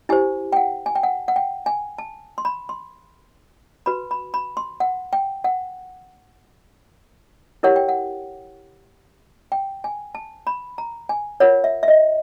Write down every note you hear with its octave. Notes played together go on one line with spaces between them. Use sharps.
E4 G4 C5 G#5
G5
F#5
G#5
G5
F#5
F#5
G5
G#5
A5
C6
B5
C6
F#4 B4 B5
B5
B5
C6
F#5
G5
F#5
E4 G4 A#4 C#5 F#5
G5
F#5
G5
G#5
A5
B5
A#5
G#5
F4 A#4 C#5 F#5
E5
E5
D#5